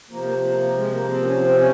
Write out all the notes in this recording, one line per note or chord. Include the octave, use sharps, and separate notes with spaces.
C3 F3 A#3
A#3
A#3
A#3
G#3
A#3
C4
C#4
C4
C#4